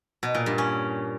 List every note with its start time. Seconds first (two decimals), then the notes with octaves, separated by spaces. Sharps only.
0.23 B2
0.35 A#2
0.46 G2
0.58 C#4